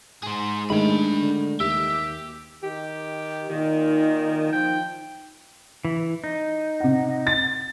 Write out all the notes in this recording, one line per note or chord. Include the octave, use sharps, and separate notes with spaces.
G#2 G#4 C5
D#3 G#3 A3 D4 B5
D3
D#2 G4 E5
D#3 G4
A#2 D#3 D#4
F3 G5
E3
D#4
C3 F#5
A6